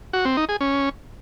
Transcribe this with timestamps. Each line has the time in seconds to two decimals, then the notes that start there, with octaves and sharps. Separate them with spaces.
0.13 F#4
0.25 C4
0.37 D#4
0.49 G#4
0.61 C#4